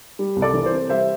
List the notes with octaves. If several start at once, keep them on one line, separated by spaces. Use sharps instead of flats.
G3
C2
A4 D5
E3
C5
C3
G3 C5 E5